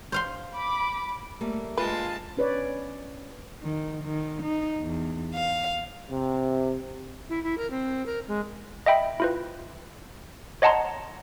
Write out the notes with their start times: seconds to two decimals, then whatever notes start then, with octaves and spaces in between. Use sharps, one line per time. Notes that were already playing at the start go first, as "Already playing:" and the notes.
0.12 C5 F5 C6
0.56 B5 D6
1.41 G3 A3 A#3
1.77 A#2 G#3 D4 F4 B4 A5
2.37 C#4 B4 C#5 D5
3.60 D#3
4.02 D#3
4.42 D#4
4.80 E2
5.34 F5
6.10 C3
7.29 E4
7.43 E4
7.58 A#4
7.70 C4
8.06 A#4
8.28 G#3
8.86 D#5 E5 G5 B5
9.20 E4 F4 B4
10.62 C#5 D#5 F#5 A5 A#5 C6